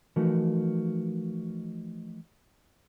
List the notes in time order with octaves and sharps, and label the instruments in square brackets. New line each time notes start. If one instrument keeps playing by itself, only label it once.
[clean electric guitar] E3 F3 A3 D#4 F#4 A#4